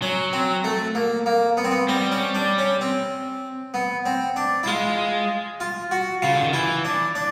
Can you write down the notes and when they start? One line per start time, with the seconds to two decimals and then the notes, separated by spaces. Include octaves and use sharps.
0.02 F#3 C#4
0.33 C4
0.64 A3
0.95 A#3
1.26 A#3
1.57 B3
1.64 C4
1.71 B3
1.89 G3 C4
2.12 C#4
2.35 D4
2.58 C#4
2.81 C4
3.74 B3
4.06 C4
4.36 D4
4.63 E4
4.67 G#3 F4
5.60 F4
5.91 F#4
6.22 C#3 F4
6.34 D3
6.44 D#3
6.53 E3 E4
6.85 D4
7.15 D4